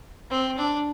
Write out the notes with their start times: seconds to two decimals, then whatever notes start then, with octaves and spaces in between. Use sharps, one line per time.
0.31 C4
0.58 D4